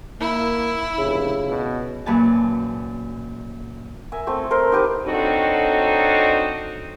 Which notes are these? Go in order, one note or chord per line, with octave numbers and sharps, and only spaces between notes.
A#3 E4
F1 C#3
B2
F#2 A#2 E3 B4 G#5 A5
A#4 E5 G#5
A3 C4 A4
A4 A#4 C5
D#4 G4 B4
F#3 C4 D4 D#4 F#4 A4